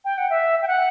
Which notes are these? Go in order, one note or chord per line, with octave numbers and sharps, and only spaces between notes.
G5
F#5
E5
G5
F#5